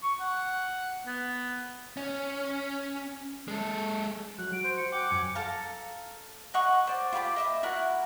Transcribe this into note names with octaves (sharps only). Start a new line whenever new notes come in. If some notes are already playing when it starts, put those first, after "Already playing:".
C#6
F#5
B3
C#4
G#3 A4
F#3 F#6
F#4 D7
C5
C#7
F#5 G5 D6
F#2 G#5
A4 F5 A#5
D#5 F#5 C#6 D#6
C5 D5
F4 G4 B5 D6
D#5 E5 D#6
E4 F#4 A#4 F#5